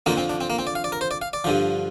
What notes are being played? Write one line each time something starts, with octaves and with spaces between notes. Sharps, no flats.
F2 D3 F3 A#3
C4
D4
C4
A#3
C4
D5
F5
D5
A#4
C5
D5
F5
D5
G2 D3 F3